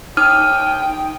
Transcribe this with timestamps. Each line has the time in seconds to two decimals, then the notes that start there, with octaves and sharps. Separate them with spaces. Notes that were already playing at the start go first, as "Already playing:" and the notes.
0.17 D#4 G5 D#6 F6 D#7